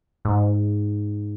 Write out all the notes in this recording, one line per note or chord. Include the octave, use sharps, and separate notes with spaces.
G#2